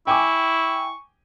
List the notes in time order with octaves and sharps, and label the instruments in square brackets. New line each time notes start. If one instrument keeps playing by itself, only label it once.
[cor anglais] E4 [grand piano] G5 G#5 D6 [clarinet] C#6